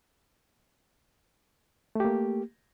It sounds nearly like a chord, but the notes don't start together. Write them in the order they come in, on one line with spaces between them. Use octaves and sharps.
A3 G4 A#3